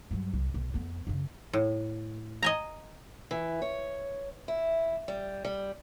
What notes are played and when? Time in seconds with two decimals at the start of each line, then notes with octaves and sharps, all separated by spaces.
0.11 G2 F#3
0.34 C2
0.54 B1
0.74 F2 B3
1.07 F#2 C#3
1.53 A2
2.43 D#5 G#5 A#5
3.31 E3
3.62 C#5
4.48 E4
5.08 G3
5.45 G3